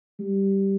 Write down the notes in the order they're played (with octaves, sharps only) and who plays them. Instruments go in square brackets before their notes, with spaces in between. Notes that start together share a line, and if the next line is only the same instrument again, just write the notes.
[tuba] G3